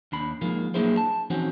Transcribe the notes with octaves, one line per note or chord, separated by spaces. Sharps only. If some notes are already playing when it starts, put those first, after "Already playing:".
D#2 D4 B5
F3 G#3 A#3 D#4 F4
F#3 A#3 D4 E4 G#4 C5
A5
E3 F3 C4 C#4 D#4 F#4